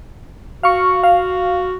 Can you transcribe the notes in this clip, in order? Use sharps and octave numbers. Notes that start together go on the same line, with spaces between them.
F#4 F5 C#6
F5